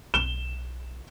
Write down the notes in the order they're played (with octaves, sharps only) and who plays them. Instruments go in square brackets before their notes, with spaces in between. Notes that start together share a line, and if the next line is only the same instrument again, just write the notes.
[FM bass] B1 [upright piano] E7 G7